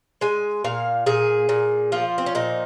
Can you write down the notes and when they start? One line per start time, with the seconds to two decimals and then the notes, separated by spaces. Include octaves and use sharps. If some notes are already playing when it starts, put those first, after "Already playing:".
0.21 G#3 G#5
0.64 A#2 F5
1.06 A#2 G#4
1.49 A#2
1.92 F3 F4
2.18 C4
2.26 C#4
2.35 A#2 D#4